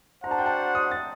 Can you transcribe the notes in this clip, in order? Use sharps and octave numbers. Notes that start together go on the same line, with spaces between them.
D4 F#4 C5 F#5 A#5
A5
G5
A5
D#6
A6